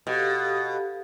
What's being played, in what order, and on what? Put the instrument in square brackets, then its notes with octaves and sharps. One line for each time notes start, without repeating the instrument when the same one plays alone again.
[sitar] B2 [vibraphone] G4 A4 F5